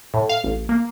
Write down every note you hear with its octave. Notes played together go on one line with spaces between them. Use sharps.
A2
F5
A1
A#3